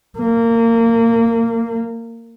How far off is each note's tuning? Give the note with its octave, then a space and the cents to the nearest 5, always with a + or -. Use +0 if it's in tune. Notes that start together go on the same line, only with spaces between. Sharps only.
A#3 -25